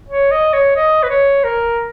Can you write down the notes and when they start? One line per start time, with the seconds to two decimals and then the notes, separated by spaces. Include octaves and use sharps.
0.08 C#5
0.31 D#5
0.53 C#5
0.76 D#5
1.03 B4
1.10 C#5
1.44 A#4